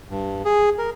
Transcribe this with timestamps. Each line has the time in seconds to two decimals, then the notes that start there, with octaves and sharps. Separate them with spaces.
0.10 G2
0.45 G#4
0.78 A#4